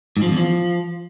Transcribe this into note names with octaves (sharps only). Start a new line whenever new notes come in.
G#2
F3
F#2
E2
F3